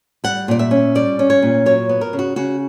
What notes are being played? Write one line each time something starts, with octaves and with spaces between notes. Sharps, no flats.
G3 F#5
A#2 D5
E5
C#4
G3 D5
C#4
C#5
A#2
F#3 C#5
B3
A#4
C#3
F#4
C#3 F#4